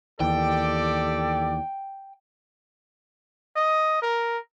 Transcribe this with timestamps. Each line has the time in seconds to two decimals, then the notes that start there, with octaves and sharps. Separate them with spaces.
0.20 D#2 E3 G4 A4 D5 G5
3.56 D#5
4.02 A#4